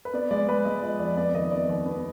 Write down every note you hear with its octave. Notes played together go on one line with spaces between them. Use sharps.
B4
B3 D5
G#3 D5
G#3 B4
G#3 D#5
F3 D#5
F2 D5
B3 D5
D#3 D#5
B3 D5
D#2
B3